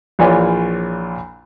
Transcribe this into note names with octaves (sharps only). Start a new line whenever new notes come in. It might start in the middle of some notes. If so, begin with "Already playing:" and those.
A#1 E3 F4 C#5 D5 G#5